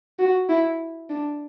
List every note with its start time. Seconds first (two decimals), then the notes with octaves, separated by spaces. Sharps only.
0.19 F#4
0.49 E4
1.10 D4